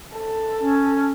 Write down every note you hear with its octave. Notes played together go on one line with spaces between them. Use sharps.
A4
C#4